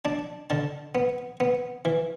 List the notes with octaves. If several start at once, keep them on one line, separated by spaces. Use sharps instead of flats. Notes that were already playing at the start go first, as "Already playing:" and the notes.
D4 A5
D3 A5
B3
B3
E3